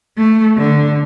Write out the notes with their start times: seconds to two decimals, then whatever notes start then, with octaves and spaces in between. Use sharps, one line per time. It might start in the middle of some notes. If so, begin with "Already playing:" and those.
0.17 A3
0.57 D3